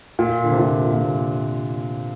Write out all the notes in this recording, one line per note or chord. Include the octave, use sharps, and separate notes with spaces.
A#2
D3
C3
A#2
A#2
C3